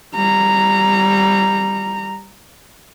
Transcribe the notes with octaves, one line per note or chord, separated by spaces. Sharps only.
G3 A#5